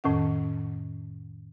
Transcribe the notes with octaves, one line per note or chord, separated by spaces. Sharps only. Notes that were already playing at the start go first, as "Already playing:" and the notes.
F2 A2 D#3 C#4 F#5